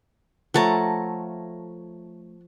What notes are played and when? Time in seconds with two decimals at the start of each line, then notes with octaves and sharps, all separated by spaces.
0.54 F3 A3 C#5 F#5 A5 A#5